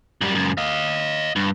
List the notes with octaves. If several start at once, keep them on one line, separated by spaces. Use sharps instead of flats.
F#2 G3
C#2 F#2
D#5 F5
G2